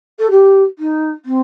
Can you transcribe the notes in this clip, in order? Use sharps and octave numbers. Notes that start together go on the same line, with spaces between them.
A4
G4
D#4
C4